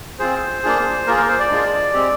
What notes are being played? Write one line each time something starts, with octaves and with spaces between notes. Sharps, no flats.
C4 F4 G#4 C5
A#3 D4 F4 G#4
A#3 F4 G#4 A#4
A#4
C5
D5
G#3 D4 F4 G#4
G#3 C4 G4